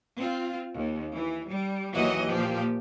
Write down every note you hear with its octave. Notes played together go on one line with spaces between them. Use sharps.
C4 F4
D#2
E3
G3
D#2 D#3 E3 F#3 F#4 D#5
A#2 F3 G4